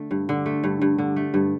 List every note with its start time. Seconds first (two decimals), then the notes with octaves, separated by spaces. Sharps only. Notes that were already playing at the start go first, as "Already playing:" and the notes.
Already playing: D3 A3
0.11 G2
0.29 D3
0.46 A3
0.64 G2
0.82 G2
0.98 D3
1.16 A3
1.34 G2